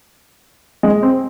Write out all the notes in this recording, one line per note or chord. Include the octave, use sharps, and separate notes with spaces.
G#3
C4